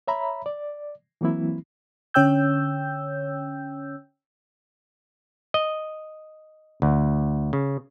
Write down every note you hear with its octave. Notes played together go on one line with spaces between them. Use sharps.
C#5 E5 A#5 B5
D5
E3 F#3 A#3 C4 E4
D3 C#4 C#5 G5 E6 G6
D#5
D2
C#3